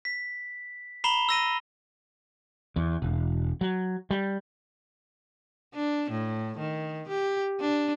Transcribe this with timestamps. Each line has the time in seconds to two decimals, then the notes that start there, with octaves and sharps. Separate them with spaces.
0.05 B6
1.04 A#5 B5 C7 E7 F7 G7
1.29 E6 A#6 D#7
2.76 E2
3.02 E1
3.61 F#3
4.11 G3
5.74 D4
6.11 A2
6.59 D#3
7.08 G4
7.61 D4